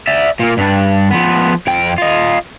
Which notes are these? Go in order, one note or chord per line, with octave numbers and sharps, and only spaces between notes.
D5 E5
A#2 A#3
G2 D4
F3 B3
F2 G5
F4 D#5